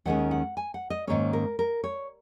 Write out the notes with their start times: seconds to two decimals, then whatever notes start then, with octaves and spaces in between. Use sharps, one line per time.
0.05 D#2 D#3 G#3 C#4 F#5
0.31 F#5
0.57 G#5
0.74 F#5
0.90 D#5
1.07 G#2 D#3 A#3 C#4 C#5
1.33 A#4
1.59 A#4
1.84 C#5